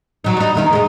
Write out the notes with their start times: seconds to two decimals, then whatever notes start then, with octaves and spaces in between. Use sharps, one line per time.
0.24 F#3 D#4
0.37 G3 D#4
0.55 E2 D#3 D#4
0.73 G#3 D#4